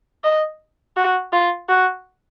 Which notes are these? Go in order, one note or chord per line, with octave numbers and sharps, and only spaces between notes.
D#5
F#4
F4
F#4